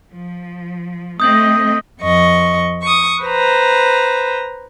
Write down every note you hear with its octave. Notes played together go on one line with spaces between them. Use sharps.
F3
A3 C4 D#5 D#6 G6 F#7
F2 D#5 C#6
C#6 D#6
B4 C5 A#5